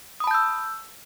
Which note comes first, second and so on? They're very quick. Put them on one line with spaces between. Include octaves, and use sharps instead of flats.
D#6 B5 A5 G6 E6